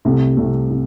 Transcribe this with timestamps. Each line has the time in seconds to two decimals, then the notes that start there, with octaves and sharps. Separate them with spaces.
0.05 C2 C3 A3
0.37 C2 C3 A3
0.71 C3